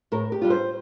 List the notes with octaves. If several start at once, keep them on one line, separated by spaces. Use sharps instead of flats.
A2 A#4
G4
G3 D4 F4
C5